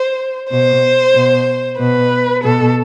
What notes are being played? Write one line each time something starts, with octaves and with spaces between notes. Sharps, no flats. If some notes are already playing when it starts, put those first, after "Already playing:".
Already playing: C5
B2 C5
B2
B2 B4
B2 A4